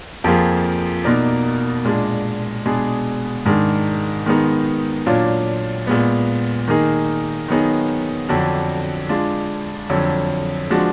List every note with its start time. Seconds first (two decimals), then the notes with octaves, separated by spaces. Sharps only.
0.24 F2 F3 A#3 F4 G#4
1.04 B2 A#3 D#4 A#4 D5
1.85 A#2 G#3 D4
2.66 B2 G#3 D4 G#4
3.45 G#2 D#3 G#3 D4
4.26 D#3 G#3 B3 D#4
5.06 A#2 F#3 D4 F4
5.87 A#2 G#3 B3
6.68 D#3 A#3 D#4 G#4
7.48 D#3 F#3 B3 D#4 G#4
8.29 F2 D3 F#3 D4 F#4
9.09 G#3 D4 F4
9.90 F2 D3 F#3
10.70 F3 G#3 D4 F#4